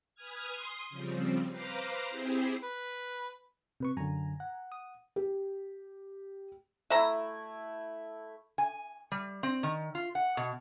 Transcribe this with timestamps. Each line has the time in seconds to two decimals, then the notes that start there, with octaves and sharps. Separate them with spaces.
0.15 B4 G#5 D#6 F6 G#6
0.49 C6 D#6
0.90 C#3 F3 G3 C4
1.49 B4 C5 F5 A#5 D6
2.10 C4 E4 G4 G#4 C5
2.63 B4
3.80 C3 B4 C#6
3.97 F#2 D3 G#5 A#5
4.40 F#5
4.72 D#6
5.16 G4
6.90 A3 E4 E5 A#5
8.58 G#5
9.12 G3
9.43 C4
9.63 D#3
9.95 F4
10.15 F#5
10.37 B2